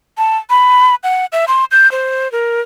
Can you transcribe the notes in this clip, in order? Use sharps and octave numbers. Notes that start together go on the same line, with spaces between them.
A5
B5
F#5
E5
C6
G6
C5
A#4